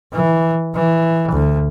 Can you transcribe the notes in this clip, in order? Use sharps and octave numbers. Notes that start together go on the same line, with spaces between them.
E3
E3
D2